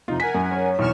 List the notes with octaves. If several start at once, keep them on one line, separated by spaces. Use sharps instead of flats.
F2 C3 D#4 F4
A#4 F#5 G#5 B6
F#2
C#5
B1 E2 C#6 F6 E7